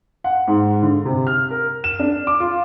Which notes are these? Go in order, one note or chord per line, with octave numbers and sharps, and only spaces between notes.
F#5
G#2
D3
C3
F6
A#4
E7
D4
D6
F4